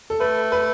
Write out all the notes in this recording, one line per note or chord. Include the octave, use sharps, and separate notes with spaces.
A4
A3 B4
B4